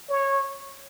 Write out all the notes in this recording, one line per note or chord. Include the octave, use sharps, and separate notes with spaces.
C#5